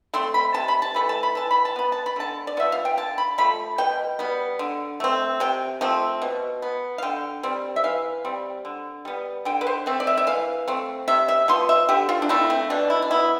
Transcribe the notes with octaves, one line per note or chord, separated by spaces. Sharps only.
A3 C4 C6
B5
C3 A5
B5
A5
E3 A3 B5
A5
B5
E3 A5
B5
A5
B3 B5
A5
B5
D3 A5
D5
F3 B3 E5
F5
G5
D3 A5
B5
F3 A3 B5
B2 G5
G3 B3
D3
A3 C4
C3 G5
F3 A3 C4
B2
B3
F5
D3 G5
G3 C4
E5
E3 F5
G3 C4
D3
G3 B3
D3 G5
B4
C5
A3 C4
D5
E5
E5
E3 F5
A3 C4
C3 E5
E5
F3 B3 C6
E5
D3 G4
F4
D4
A3 C4 E4
C4
B2 D4
E4
D4
B3 E4